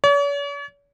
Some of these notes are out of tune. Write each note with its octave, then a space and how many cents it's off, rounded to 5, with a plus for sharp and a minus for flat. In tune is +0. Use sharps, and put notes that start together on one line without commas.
C#5 +45